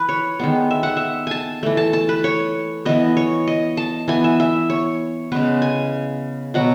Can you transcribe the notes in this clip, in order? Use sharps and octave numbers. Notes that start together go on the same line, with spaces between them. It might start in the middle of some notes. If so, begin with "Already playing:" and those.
Already playing: E3 B4
C#5
D#3 G#3 B3
E5
F#5
E5
G#5 A5
E3 A3
A5
A5
B4
C#5
E3 B3 D#5
C#5
D#5
A5
E3 B3 G#5
E5
E5
C#5
C#3 G#3 B3 B4
G#5
B2 F#3 B3 F#5